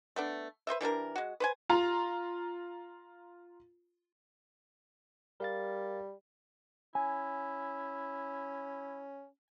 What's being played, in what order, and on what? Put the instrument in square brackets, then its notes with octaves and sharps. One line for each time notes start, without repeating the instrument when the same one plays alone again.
[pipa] A3 B3 D4
B4 C5 D#5 E5
E3 G3 D4 A#4
G#3 F#4
B4 C5 G#5
[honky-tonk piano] F4 A#5
[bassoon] G3 [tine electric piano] A#4 F5 A6
[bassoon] C#4 [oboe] E4 [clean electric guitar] G#5